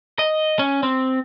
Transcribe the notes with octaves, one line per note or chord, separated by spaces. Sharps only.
D#5
C#4
C4